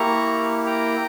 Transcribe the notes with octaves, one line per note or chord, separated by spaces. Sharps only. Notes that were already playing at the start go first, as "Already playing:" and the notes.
Already playing: A#3 E4 G4 A#5 C#6
G5 A#5